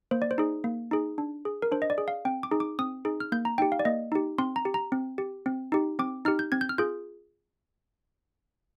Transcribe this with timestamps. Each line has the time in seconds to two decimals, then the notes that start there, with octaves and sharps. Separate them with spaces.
0.11 A#3 C5
0.22 D5
0.31 C5
0.38 D#4 G#4
0.64 A#3
0.91 D#4 G#4
1.18 D4
1.45 G#4
1.62 A#4
1.72 D4 C5
1.82 D#5
1.90 D5
1.98 G#4
2.08 F5
2.25 C4 G5
2.43 D6
2.51 D#4 G#4
2.60 D6
2.79 C4 D#6
3.05 D#4 G#4
3.20 F6
3.32 A#3 G6
3.45 A#5
3.58 D#4 G4 G5
3.72 F5
3.79 D5
3.85 A#3 D#5
4.12 D#4 G4
4.38 C4 C6
4.56 A#5
4.65 G4
4.74 A#5
4.92 C4
5.18 G4
5.46 C4
5.72 D#4 G4
5.99 C4 D6
6.25 D#4 G4 F6
6.39 G6
6.52 C4 G#6
6.61 G6
6.69 F6
6.78 F4 G#4 G6